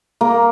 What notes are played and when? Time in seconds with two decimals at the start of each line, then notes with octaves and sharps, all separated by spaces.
0.21 A#3